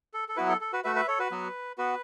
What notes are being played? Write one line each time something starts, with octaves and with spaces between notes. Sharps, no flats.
A4
A4
F#3 B3 E4 F#4 B4
A4
A4
F#4 B4
A3 F#4 B4 E5
B4 E5
A4 C#5
F#4 B4
F#3 B3 F#4
B3 F#4 B4